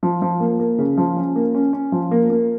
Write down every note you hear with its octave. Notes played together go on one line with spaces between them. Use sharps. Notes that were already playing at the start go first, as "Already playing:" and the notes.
F3
F3
A#3
A#3
C#3
F3
C#4
A#3
C#4
C#4
F3
A#3
A#3